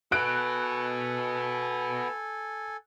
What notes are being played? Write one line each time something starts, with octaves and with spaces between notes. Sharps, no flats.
F#4 A4 B4 G#5 F#6 D7